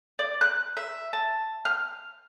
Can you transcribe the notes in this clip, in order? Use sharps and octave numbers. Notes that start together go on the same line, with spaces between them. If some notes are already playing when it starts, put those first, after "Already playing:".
D5
F#6
E5
A5
F6